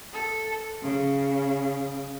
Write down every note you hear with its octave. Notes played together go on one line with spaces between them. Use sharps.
A4
C#3